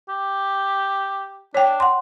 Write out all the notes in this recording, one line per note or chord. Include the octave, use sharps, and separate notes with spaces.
G4
D4 C#5 G5
F#5 C6